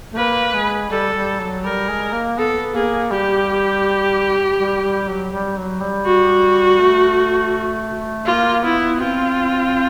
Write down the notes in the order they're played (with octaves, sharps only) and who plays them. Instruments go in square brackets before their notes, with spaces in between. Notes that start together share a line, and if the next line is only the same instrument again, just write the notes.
[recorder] A3
[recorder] A#3 [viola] B4
[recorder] G#3
[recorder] G3 [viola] A4
[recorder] G3
F#3
[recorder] G3 [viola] A#4
[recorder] G#3
A#3
[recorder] B3 [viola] A4
[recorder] A#3 [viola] G#4
[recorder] G3 [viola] G4
[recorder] G3
G3
F#3
G3
F#3
G3
[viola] F#4
[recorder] A3
[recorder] A#3 [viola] F4
[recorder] B3 [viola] E4
[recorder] C4 [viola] F4